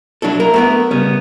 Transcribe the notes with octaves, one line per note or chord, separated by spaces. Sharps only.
F#3 D4 E4 A4
A#3 E4 A#4
A3 B3 A#4
C#3 G3 B3 C#4